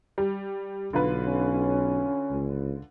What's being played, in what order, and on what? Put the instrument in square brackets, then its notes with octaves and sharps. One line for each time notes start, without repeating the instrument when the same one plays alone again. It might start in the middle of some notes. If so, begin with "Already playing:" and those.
[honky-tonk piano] G3
[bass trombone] B1 [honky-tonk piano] D3 F4 B4
[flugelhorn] C#4
[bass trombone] C#2